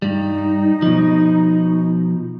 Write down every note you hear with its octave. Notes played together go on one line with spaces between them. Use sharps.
G2 G3 D#4
B2 F3